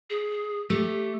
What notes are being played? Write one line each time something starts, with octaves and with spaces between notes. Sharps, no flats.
G#4
A3 G4